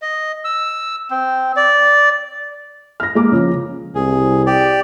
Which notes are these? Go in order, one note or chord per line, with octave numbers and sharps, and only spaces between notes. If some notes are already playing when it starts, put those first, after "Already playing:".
D#5
E6
C4
D5
F6 A#6
G#3 A#3 D6
C#3 F3
C2 G#4
G4 D5